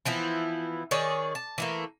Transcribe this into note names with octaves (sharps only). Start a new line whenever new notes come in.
E3 F3 B3 E4
D#3 G#4 C#5 D5
A5
E3 A3 A#3